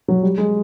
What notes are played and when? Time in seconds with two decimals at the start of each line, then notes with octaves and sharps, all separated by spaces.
0.08 F#3
0.23 G3
0.38 G#3